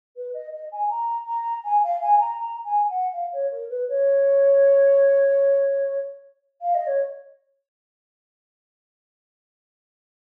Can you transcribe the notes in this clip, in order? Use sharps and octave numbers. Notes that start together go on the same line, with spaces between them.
B4
D#5
D#5
G#5
A#5
A#5
G#5
F5
G#5
A#5
A#5
G#5
F#5
F5
C#5
A#4
B4
C#5
F5
D#5
C#5